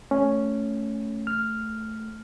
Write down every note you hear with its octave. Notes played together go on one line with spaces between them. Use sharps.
A3 C#4
F6